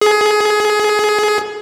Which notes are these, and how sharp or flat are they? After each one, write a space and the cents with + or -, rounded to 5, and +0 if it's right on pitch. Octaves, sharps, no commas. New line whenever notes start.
G#4 +20